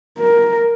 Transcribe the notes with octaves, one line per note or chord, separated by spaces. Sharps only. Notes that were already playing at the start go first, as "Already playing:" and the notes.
A#4